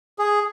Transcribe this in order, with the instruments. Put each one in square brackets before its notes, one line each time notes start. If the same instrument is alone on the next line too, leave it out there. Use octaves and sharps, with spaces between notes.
[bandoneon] G#4